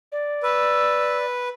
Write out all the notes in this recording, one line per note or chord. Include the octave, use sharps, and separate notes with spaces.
D5
B4 E6